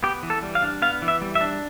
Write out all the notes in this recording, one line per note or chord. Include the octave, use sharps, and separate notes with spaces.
B3 G4
E3
A4
G3
F5
D4
B3 F5
E3
E5
G3
E5
D4